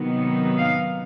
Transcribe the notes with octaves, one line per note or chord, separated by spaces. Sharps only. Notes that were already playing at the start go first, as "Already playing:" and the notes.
Already playing: C3 D#3 F#3 B3 D#4
F5